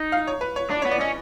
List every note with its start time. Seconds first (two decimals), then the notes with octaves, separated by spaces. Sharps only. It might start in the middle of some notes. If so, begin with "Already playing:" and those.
Already playing: D#4
0.12 F5
0.27 C#5
0.41 B4
0.56 C#5
0.71 D4 D5
0.82 B3 C#5
0.91 D5
1.00 C#4 D#5